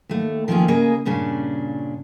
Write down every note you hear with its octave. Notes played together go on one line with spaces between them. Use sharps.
D#2 A3
D#3 F3 A#3 C4 C#4 G#4
C#3 A#3 G#4 D#5
G2 A#2 C#3 C#4 D4